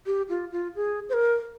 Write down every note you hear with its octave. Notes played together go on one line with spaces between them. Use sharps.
G4
F4
F4
G#4
C5
A#4